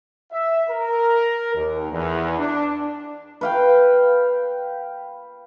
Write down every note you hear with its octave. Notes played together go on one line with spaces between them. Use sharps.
E5
A#4
D#2
E2
D4
B4 F5 G5